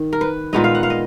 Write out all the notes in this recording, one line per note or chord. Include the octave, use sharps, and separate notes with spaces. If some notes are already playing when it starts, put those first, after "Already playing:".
Already playing: D#3
A#4
B4
A#2 G#3 B3 D#4 D#5
F5
F#5
F5
D#5